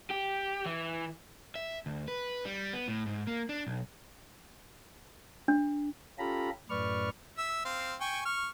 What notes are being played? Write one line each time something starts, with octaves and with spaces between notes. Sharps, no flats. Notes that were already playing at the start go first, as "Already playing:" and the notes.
G4
E3
E5
D2
B4
G3
B3
A2
G#2
A#3
D4
B1
D4
C#4 F4 G4 A4 A#5 B5
F#2 A2 B4 D5 C#6 F6
E5 E6
C4 F5
G5 G#5 C#6
C#6 F6